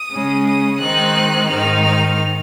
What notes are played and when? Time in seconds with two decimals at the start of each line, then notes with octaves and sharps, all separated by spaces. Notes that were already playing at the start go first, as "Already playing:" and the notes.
Already playing: D#6
0.11 C#3 G#3 C#4
0.45 D#6
0.79 D#3 G#3 C4 D#4 F#6
1.48 G#2 D#3 G#3 C4 D#4 F6
1.82 F6